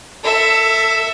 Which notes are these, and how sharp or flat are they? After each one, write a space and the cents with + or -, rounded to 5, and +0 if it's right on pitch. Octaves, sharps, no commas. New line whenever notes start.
A4 +20 E5 +0